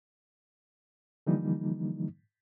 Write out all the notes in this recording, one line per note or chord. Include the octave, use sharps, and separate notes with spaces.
D3 E3 F3 G3 A#3 D#4